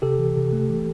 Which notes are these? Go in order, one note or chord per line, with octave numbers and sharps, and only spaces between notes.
C3 G4 A4
E3
C3
A3
E3